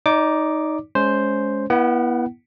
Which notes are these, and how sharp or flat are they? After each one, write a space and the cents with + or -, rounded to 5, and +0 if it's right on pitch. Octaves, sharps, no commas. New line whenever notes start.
D#4 +5 D5 -30 D6 +0
G#3 +15 C#4 +20 C5 +0
B3 -30 E4 +0 F#5 +35